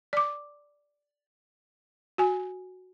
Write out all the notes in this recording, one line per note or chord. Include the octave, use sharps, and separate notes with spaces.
D5 D6
F#4 G#5